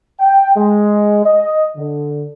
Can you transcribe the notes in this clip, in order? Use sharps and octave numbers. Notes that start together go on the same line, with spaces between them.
G5
G#3
D#5
D3